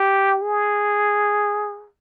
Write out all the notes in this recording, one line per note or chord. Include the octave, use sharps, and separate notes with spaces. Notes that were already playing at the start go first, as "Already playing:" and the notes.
Already playing: G4
G#4